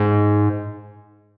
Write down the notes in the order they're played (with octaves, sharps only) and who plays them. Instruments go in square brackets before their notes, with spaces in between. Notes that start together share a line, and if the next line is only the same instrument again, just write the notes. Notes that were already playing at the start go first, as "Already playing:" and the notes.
Already playing: [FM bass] G#2